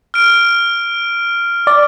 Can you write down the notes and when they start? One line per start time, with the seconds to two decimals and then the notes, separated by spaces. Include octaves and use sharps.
0.14 F6 D7
1.67 D5